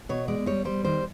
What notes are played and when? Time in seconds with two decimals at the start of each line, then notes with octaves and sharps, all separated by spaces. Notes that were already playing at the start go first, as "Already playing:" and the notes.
0.09 B2 C#5
0.28 G#3 D5
0.46 G3 C#5
0.65 G3 C5
0.84 D#3 C5